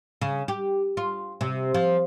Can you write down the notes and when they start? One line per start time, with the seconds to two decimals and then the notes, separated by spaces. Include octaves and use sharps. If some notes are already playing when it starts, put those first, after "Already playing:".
0.21 C#3
0.48 G4
0.97 F4
1.41 C3
1.74 F3